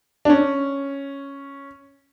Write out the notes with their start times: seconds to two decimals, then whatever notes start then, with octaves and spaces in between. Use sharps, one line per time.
0.25 D4
0.30 C#4